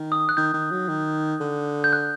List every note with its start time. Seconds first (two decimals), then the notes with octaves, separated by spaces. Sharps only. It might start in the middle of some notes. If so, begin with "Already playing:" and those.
Already playing: D#3
0.12 D#6
0.29 F#6
0.37 D#3 G6
0.54 D#3
0.71 F#3
0.89 D#3
1.40 D3
1.84 G6
1.93 F#6